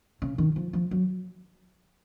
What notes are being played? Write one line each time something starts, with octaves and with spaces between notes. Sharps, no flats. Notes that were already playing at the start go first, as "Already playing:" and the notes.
C#3
D#3
F3
F3
F#3